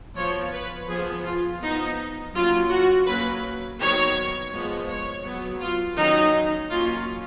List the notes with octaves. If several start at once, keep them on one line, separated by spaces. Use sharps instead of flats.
F3 B3 C#5
B4
F3 B3 G#4
F4
F3 B3 D#4
F#3 A#3 C#4 F4
F#4
F#3 A#3 C#4 B4
D#3 F#3 B3 C#5
F3 G#3 B3
C#5
F#3 B3
F4
D#3 F#3 A#3 C#4 D#4
F#3 A#3 C#4 F4